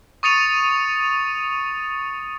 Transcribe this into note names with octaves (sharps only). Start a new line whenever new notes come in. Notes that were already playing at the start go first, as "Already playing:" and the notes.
C#6 D#6 A6 C#7 D#7 F7